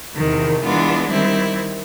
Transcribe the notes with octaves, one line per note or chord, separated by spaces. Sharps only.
E2 C3 D#3
E3 G#3 B3 D4 F4
D#3 G3 C4 E4